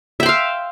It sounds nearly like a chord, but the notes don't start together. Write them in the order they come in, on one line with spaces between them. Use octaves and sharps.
E5 G5 C6 F5